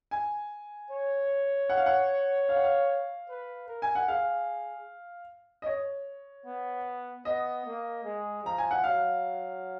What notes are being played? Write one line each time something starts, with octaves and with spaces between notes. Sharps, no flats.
G#5
C#5
F#5
F5
F#5
F5
F#5
F5
B4
A#4
G#5
F#5
G#4 F5
D#5
C#5
B3
B3 D#5
A#3
G#3
F3 A#5
G#5
F#5
F#3 F5